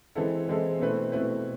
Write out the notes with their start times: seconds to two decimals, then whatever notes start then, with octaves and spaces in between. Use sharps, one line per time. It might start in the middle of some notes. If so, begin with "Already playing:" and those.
0.15 E3 G#3 C4 E4 A4
0.48 E3 G#3 C4 E4 A4
0.80 B2 A3 C4 E4 B4
1.12 B2 A3 C4 E4 B4